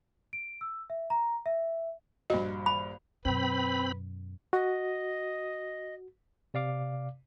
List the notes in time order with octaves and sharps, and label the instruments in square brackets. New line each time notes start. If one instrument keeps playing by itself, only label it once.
[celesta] D7
E6
E5
A#5
E5
[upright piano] A#1 G2 [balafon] F#4 D#5
[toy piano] B5
[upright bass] F#2 B2 [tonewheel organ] C4 B5 [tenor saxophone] B4
[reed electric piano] F#4 [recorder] D#5
[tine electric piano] C3 D5 F5 D6